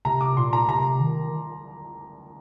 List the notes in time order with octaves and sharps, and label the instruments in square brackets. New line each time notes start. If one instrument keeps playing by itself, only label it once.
[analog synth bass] C3 [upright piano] A#5
[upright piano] D6
[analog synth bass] A#2 [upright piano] C6
[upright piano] A#5
[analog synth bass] C3 [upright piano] A#5
[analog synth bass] D#3